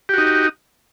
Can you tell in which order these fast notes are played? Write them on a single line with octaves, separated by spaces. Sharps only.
G4 F#4 D#4